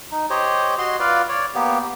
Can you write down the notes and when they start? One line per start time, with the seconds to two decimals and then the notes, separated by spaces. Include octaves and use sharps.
0.12 D#4
0.30 G4 C5 C#5 D#5
0.78 F#4 D#5 C6
1.00 F4 B4 D5 F5
1.29 C#5 D5
1.55 A#3 B3 G4